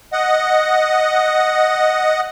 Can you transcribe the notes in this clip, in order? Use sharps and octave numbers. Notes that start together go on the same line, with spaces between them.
D#5 F#5